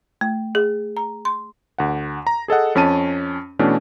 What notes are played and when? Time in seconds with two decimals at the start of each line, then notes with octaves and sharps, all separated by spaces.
0.21 A3
0.55 G#4
0.97 A#5
1.25 C6
1.78 D2 F#5
2.27 A#5
2.48 G#4 A4 D#5 F#5
2.75 F2 C#4 A5 D#7
3.59 B2 E3 A3 C#4 D4